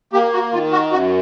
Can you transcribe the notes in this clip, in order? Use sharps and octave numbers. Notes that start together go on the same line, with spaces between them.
A#3 G4
F#4
D#3 F4
F#4
F#2 F#4